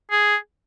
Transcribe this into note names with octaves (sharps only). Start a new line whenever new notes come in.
G#4